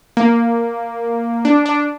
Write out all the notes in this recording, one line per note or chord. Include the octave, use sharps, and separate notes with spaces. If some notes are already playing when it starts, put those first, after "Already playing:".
A#3
D4
D4